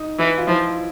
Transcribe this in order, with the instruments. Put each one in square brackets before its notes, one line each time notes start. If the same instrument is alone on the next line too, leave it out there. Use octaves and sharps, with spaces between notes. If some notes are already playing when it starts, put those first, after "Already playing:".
Already playing: [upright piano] D#4
[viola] E3 [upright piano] E4
[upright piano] F4
[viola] F3 [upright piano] E4